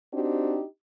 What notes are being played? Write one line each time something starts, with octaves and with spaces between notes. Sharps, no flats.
C4 D4 D#4 F#4 G4